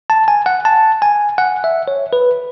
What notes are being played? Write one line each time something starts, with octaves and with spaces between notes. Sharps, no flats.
A5
G#5
F#5
A5
G#5
F#5
E5
C#5
B4